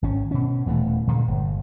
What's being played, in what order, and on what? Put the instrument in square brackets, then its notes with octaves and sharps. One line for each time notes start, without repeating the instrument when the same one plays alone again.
[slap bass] G#1 C#4
B2 C#4
D#1 E3 A3
A#2 D3 E3 G#3
G1